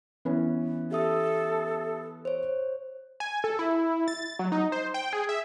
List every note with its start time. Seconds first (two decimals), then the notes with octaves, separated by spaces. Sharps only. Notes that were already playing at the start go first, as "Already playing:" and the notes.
0.25 E3 B3 C#4
0.91 G4 A4 E5 D#6
2.25 C5 C#5
3.20 G#5
3.44 A4
3.59 E4
4.08 A6
4.39 F#3
4.52 D#4
4.72 C5
4.94 G5
5.13 G#4
5.29 E5